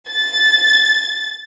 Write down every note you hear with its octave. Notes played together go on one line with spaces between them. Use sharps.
A6